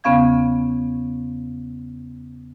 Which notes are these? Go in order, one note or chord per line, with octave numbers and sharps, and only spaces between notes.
E2 C#3 B3 C#4 F5 G#6